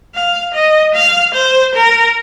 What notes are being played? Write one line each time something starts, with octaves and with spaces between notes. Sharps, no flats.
F5
D#5
F5
C5
A#4